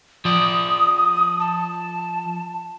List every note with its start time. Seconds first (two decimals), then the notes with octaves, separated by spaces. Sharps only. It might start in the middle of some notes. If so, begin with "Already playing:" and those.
0.25 F3 D5 D#6
1.40 A5